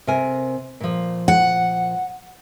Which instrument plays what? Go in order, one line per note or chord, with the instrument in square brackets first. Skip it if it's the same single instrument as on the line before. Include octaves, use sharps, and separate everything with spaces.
[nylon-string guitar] C3 A#4 G#5
A#2 F3
[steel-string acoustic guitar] F#5